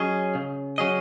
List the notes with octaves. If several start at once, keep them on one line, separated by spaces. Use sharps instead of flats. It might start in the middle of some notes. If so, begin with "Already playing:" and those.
Already playing: F#3 C#4 G#4 D#5
C#3
F#3 C#4 G#4 D#5